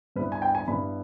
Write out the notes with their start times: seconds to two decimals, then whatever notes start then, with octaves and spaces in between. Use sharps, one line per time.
0.16 G2 G3 B3 E4 B4
0.32 G#5
0.42 G5
0.55 G#5
0.67 G2 G3 B3 E4 B5